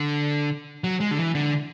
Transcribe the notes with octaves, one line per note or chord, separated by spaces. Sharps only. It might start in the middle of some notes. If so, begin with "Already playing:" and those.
Already playing: D3
F#3
G#3
D3
E3
D3